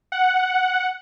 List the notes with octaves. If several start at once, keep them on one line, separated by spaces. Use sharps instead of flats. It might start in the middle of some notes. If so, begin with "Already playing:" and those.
F#5